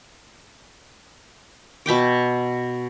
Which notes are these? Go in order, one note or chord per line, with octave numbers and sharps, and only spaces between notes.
B2 E5 G5 D6